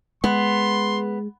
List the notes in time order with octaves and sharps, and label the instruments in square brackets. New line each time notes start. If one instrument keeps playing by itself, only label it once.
[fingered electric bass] G#3 [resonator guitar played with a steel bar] B3 [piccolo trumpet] C6